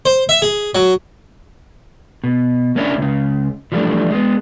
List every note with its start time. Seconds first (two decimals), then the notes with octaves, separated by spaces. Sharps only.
0.06 C5
0.29 E5
0.42 G#4
0.75 F#3
2.24 B2
2.76 A#3 C#4 D4 E4
2.98 C#2 C#3
3.72 E3 F3 G3 A3 D4
4.11 G#3 B3